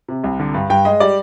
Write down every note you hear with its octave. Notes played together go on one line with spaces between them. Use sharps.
C3
C2
D3
G2
G2 G5
G#3 D#5
G3 D5